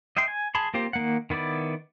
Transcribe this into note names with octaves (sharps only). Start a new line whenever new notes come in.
D#5 E5 G5 C6
G#5
G#4 A5 B5 C6
A#3 C4 F4 G4 C5
D#3 A#3 F#5
D#3 B3 E4 D5